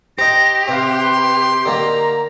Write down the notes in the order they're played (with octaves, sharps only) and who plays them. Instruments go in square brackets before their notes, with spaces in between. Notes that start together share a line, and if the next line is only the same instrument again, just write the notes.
[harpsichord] D#4 C5 [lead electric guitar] G4 [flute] A#6
[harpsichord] C3 F5 [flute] B4 [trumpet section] C6
[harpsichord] D3 D#3 A#3 [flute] A#5